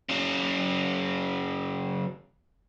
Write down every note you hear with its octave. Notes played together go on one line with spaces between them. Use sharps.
C#3 F#3